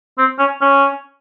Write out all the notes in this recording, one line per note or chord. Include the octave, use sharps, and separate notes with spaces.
C4
C#4
C#4